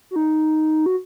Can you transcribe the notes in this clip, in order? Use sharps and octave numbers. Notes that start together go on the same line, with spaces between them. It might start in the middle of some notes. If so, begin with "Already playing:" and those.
F#4
D#4
F#4